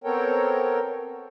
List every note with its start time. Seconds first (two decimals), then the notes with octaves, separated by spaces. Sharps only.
0.04 B3 C4 A4 A#4 C#5 G5